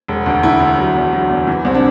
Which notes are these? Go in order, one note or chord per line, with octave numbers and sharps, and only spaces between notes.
E1
D2
D2 E4
D2
F#3
E2
F#3
E2
E3
C2 C4
D4